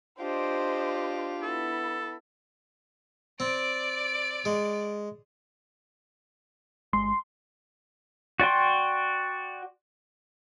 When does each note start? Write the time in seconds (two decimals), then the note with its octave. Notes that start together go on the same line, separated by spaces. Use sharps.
0.20 D4 F4 G4 C5 D#5
1.43 B3 E4 A4
3.40 C4 D5 D7
4.45 G#3
6.93 G1 G#3 C6
8.40 F#4 D5 G5 C6